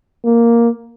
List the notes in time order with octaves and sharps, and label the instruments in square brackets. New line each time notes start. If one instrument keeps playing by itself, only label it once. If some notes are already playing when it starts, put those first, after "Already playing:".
[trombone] A#3